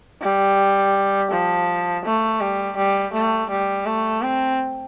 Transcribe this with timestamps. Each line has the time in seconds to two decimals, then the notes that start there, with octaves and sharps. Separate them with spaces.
0.22 G3
1.31 F3
2.05 A3
2.40 G3
2.77 G3
3.13 A3
3.50 G3
3.86 A3
4.22 C4